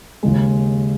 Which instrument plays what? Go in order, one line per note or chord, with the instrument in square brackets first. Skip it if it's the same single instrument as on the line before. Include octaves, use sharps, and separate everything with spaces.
[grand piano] D#2 C#3 G#3